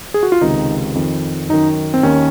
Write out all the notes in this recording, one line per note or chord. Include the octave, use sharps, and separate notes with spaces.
G#4
F#4
F4
C#2 C3 D#3 D#4
F2 D#3
F#2 D#3 D#4
C4
D#2 D#3 C#4